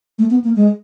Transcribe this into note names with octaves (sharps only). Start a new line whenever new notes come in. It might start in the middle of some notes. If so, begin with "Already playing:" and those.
A3
B3
A#3
G#3